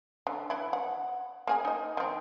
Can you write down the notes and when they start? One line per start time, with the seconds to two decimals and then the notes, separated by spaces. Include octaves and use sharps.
0.27 D3
0.50 E3 E4
0.73 F#5
1.47 A#3 G#4 G#5
1.65 D#4 D#5
1.97 D#3 C4